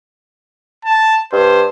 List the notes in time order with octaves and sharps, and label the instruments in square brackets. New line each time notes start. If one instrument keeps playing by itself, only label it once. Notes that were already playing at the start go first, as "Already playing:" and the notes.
[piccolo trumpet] A5
[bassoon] G2 [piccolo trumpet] C5